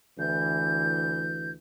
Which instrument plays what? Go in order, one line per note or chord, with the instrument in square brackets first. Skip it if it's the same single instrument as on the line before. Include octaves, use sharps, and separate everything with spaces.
[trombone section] D2 E3 [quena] G6